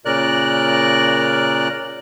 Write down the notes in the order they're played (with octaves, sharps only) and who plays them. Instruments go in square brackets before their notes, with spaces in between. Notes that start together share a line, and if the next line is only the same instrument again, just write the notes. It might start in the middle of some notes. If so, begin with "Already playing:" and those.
[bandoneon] A#2 C#3 A#4 D5 F#6